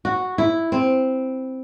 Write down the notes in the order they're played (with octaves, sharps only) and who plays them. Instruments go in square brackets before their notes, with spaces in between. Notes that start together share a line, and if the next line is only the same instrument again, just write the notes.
[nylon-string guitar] F#4
E4
C4